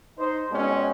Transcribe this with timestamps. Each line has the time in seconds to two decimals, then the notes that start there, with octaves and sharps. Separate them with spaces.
0.18 D#4 C5
0.51 B2 G3 G#3 C4 C#4